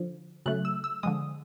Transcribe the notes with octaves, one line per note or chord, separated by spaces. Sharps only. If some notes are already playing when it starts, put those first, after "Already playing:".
Already playing: D3 F3
C#3 F#3 A3 F#6
E6
E6
D3 F3 G#3 D#6